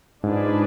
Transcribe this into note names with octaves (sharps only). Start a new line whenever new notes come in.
G#2 D4 F4 G#4 B4 D5